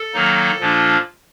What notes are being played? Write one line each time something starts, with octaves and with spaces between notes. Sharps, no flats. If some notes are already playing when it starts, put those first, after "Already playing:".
Already playing: A4
D#3 F#3 A#3 D#4
A#2 F3 A#3 D4 F4